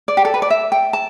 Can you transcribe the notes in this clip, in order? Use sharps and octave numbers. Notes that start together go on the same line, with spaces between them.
D5
G4
A4
B4
D5
E5
G5
A5